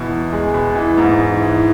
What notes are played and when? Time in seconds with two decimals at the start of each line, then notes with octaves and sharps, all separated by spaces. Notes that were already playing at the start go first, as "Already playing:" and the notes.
Already playing: B2 E3
0.11 E2
0.33 G#3
0.54 B2
0.76 E3
0.98 G#2
1.18 E3
1.40 E3